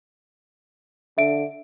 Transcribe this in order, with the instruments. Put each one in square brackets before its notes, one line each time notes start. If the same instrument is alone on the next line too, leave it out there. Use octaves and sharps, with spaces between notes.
[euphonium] D3 [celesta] E5 D7